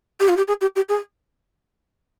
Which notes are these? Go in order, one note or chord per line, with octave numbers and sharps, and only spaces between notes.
G4
F4
G4
G#4
G4
G4
G#4